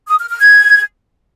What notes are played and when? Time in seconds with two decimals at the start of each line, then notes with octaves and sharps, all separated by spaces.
0.08 D#6
0.19 F6
0.30 F6
0.40 G#6